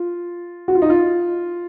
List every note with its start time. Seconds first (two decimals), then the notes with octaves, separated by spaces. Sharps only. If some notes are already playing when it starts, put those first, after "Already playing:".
Already playing: F4
0.68 F#4
0.75 F4
0.82 D#4
0.90 F4